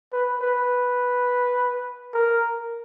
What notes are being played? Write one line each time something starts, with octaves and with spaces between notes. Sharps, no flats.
B4
B4
A#4